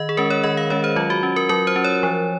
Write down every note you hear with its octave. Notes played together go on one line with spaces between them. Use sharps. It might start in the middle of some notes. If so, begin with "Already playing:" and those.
Already playing: D#3 D#5
G#4
G#3 C#4 A#4
C#5
D#3 D#5
F5
G#3 C#4 C#5
C5
F#3 F4
F#4
C#4
A#4
F#3 A#4
C5
C#4
C#5
F3